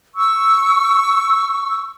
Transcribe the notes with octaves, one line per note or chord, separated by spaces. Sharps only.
C#6 E6